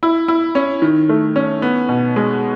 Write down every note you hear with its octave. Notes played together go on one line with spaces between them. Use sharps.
E4
E4
C#4
D#3
A3
C#4
B3
B2
G#3